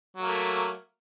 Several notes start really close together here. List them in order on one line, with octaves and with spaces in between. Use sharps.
F#3 A#3 A3